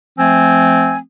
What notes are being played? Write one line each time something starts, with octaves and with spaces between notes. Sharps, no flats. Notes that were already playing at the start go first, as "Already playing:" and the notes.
F3 A3 C4 G#5